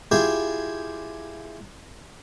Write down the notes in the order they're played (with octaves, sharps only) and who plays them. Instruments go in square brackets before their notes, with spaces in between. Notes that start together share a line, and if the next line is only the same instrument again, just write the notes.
[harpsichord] E4 F4 G4 G#4